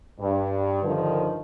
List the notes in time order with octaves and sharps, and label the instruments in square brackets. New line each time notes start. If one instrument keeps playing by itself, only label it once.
[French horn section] G2
G2 D3 D#3 F3